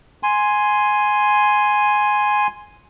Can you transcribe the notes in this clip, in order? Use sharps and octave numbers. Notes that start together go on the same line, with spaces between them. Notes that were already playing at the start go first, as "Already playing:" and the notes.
G#5 C6